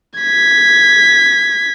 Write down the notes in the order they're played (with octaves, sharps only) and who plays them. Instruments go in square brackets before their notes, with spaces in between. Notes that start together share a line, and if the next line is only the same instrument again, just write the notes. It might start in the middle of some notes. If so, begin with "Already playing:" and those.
[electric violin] G#6 B6